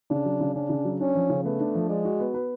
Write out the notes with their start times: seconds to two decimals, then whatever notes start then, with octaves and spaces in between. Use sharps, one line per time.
0.10 C#3 D4
0.25 F#3
0.40 C#3
0.54 C#4 D4
0.69 C#3
0.85 F#3
1.00 C#4 D4
1.15 F3
1.29 C#3
1.45 A3 B3
1.60 D4
1.75 F3
1.89 G#3 D5
2.05 F#4
2.20 B3
2.34 B4